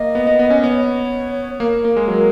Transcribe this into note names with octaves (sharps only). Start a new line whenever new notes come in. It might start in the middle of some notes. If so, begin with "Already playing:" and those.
Already playing: A#3 D#5
B3
B3
B3
C#4
B3 C#5
A#3 A#4
A#3
G#3
F#3